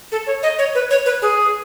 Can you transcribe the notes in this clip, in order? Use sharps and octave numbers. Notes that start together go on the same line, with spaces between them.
A4
C#5
D#5
C#5
B4
C#5
B4
G#4